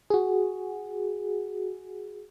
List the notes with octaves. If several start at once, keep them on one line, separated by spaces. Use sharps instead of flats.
F#4 G#4